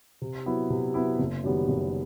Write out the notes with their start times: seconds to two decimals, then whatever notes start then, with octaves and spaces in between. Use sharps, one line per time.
0.22 C3
0.46 F#3 B3 E4
0.70 C3
0.94 F#3 B3 E4
1.19 F#1
1.44 F#2 D#3 G3 B3
1.68 F#1